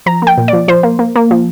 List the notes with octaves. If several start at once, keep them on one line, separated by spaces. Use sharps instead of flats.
F3 A#5
A#3 G5
A#2
D5
F3
F3 C5
A#3
A#3
A#3
F3